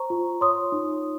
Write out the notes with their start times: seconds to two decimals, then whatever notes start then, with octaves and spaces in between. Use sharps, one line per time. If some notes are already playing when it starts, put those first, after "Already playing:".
Already playing: C5 A#5 C#6
0.10 F4
0.41 C#5 C6 D#6
0.72 D#4